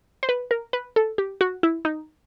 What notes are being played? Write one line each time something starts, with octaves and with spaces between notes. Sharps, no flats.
C5
B4
A#4
B4
A4
G4
F#4
E4
D#4